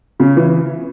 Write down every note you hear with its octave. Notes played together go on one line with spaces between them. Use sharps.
C#3
E3